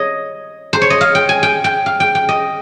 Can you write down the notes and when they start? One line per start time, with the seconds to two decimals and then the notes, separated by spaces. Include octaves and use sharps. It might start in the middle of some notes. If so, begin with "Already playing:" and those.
Already playing: C#5 D#5
0.73 C5
0.82 C#5
0.90 D#5
1.01 F5
1.15 G5
1.29 G#5
1.43 G5
1.64 G5
1.86 F5
2.00 G5
2.15 G5
2.29 D#5